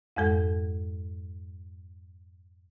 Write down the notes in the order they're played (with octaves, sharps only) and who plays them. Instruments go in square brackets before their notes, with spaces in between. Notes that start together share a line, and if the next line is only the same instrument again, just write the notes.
[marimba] F2 G#2 G#3 A4